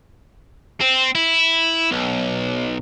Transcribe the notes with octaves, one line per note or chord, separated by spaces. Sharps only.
C4
E4
B1